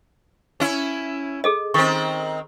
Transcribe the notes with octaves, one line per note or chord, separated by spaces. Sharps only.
C#4 E4
G#4 A4 D#5
D#3 C4 C#6